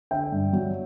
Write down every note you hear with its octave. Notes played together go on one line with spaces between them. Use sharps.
D3 E5 G5
G2
F#3